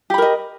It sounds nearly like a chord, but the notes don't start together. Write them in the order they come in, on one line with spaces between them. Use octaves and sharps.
G4 B5 A#4 D#5